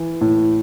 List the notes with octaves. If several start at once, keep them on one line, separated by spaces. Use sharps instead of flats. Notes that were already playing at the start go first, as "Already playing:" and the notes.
Already playing: E3
A2